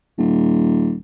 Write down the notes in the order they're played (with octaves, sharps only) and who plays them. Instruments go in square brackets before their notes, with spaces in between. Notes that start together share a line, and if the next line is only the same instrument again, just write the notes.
[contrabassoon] D#1